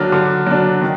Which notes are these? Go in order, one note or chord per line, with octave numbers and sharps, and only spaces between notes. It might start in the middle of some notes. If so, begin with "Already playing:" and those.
Already playing: D3 F#3 D4 F6
D3
F#3 D4
D#3